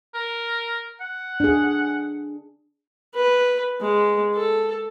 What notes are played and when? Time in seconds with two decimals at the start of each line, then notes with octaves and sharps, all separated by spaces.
0.14 A#4
1.01 F#5
1.40 D4 G#4
3.15 B4
3.80 G#3
4.35 A4